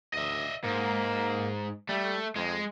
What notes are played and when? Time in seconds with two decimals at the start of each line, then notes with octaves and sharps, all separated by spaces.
0.14 D2 D#5 E5
0.64 G#2 A#3
1.89 G3 A3
2.36 F2 G#3